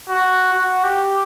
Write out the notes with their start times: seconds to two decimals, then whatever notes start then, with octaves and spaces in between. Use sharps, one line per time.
0.09 F#4
0.54 F#4
0.84 G4